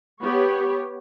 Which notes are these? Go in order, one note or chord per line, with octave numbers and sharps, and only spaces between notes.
B3 G4 C#5